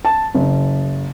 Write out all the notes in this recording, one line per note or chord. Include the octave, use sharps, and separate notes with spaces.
A5
F#1